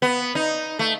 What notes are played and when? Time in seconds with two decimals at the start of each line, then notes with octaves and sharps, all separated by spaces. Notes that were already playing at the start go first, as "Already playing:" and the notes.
0.02 B3
0.35 D#4
0.79 A3